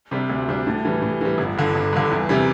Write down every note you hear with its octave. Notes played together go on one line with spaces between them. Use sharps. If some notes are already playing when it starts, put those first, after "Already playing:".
C3 G3 D4
D2
C3 G3 D4
A2
E3 G3
A2
E3 G3
G1
G2 D3
G1
G2 D3
E2
C3 E3 G3